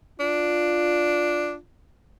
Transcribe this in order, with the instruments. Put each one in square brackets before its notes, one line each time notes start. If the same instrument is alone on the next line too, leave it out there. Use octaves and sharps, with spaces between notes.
[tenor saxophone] D4 [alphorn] F4